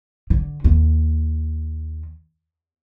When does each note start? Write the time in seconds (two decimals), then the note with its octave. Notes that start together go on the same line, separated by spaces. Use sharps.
0.30 D3
0.64 D#2